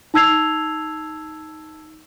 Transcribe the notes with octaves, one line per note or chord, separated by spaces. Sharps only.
D#4 A5 E6 G#6 C7 F7